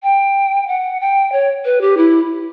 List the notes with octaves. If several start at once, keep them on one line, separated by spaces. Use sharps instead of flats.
G5
F#5
G5
C#5
B4
G4
E4